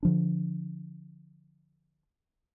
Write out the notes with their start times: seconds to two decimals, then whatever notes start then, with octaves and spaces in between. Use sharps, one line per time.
0.03 D3 F3 D4